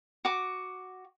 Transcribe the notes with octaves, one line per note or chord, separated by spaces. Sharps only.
F#4 D6